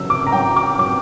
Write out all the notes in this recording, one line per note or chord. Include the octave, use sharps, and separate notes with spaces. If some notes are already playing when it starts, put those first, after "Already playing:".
Already playing: C#3 F#3 E6
D6
A#5
F#3 G5
D6
F#3 D6